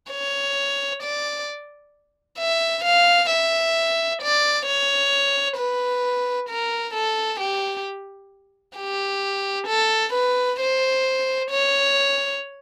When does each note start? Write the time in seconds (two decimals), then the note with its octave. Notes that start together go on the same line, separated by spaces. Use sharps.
0.11 C#5
1.03 D5
2.39 E5
2.84 F5
3.31 E5
4.22 D5
4.66 C#5
5.57 B4
6.50 A#4
6.94 A4
7.40 G4
8.77 G4
9.68 A4
10.13 B4
10.60 C5
11.51 C#5